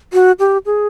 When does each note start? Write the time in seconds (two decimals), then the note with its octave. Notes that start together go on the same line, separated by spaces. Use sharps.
0.13 F#4
0.39 G4
0.66 G#4